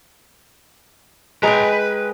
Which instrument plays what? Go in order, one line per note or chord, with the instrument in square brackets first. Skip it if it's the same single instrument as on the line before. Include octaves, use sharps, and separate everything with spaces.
[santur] G#3 G5 [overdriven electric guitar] B4 A#5